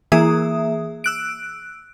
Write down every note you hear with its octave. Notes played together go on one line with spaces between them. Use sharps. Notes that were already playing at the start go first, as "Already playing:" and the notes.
E3 A#3 G#4 E5 D#6
E6 F#6 D7